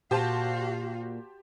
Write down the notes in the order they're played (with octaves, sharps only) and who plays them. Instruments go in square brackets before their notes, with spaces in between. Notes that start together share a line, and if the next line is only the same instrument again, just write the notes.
[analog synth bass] A#2 [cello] F#4 F5 [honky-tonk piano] G4 C5 A5